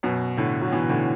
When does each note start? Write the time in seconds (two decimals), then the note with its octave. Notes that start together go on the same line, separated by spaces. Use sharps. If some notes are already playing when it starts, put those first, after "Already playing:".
0.03 F#2 B2
0.37 A2 D3
0.62 F#3
0.72 B2 E3
0.89 A2 D3